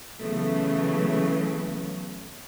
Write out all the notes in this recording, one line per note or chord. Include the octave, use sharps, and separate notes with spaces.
C#3 E3 F#3 A3 B3